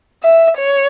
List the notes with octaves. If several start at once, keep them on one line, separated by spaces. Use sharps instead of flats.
E5
C#5